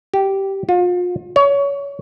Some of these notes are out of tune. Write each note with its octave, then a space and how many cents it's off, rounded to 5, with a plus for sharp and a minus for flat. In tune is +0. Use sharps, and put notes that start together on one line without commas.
G4 -10
F4 +35
C#5 +25